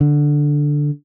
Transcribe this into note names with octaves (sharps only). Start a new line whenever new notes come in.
D3